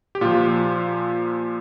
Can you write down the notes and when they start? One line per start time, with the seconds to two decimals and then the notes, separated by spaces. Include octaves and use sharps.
0.15 G4
0.21 A#2 F3 F4